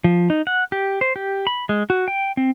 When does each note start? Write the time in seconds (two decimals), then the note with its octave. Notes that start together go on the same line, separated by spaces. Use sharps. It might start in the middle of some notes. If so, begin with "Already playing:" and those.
0.04 F3
0.30 D#4
0.47 F#5
0.72 G4
1.01 C5
1.16 G4
1.47 B5
1.69 G#3
1.90 F#4
2.08 G5
2.37 C4